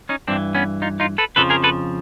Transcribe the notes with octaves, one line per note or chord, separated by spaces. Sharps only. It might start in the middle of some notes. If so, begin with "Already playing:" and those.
C#4 D#4
G2 E3 C4 D4
B3 C#4
D#4 F4
D#4 F4
A4 B4
F2 C#3 F3 A4 B4
G#4 A#4
A4 B4